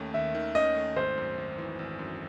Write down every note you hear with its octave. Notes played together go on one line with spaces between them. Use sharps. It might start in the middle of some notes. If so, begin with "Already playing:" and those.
Already playing: D#2 D#3 A3 C#4
D#2 E5
D#3
C#4 D#5
A3
G#1 C5
F#2
G#1
E3
G#1
F#2